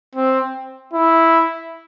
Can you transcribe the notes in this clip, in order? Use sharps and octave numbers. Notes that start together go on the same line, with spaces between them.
C4
E4